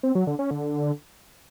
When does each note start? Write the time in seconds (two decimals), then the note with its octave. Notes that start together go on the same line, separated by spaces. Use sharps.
0.03 C4
0.15 F#3
0.27 D3
0.39 C#4
0.51 D3